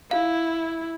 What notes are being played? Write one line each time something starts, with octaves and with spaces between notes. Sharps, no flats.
E4 F5